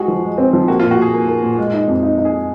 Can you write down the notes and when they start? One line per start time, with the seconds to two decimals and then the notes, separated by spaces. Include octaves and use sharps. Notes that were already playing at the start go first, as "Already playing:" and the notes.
Already playing: G#3 F#4 G#4
0.08 F3
0.23 G#3
0.38 C4
0.53 F3
0.68 A#3 F#4
0.80 F4
0.83 A#2
0.91 F#4
0.98 A#2 G#4
1.13 A#3
1.28 A#3
1.43 A#2
1.58 G#3
1.73 D#4
1.88 F2
2.03 D#4
2.18 D#4
2.25 G#4